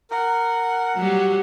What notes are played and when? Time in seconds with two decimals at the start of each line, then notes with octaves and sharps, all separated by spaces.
0.11 A#4 F#5
0.96 F#3 G3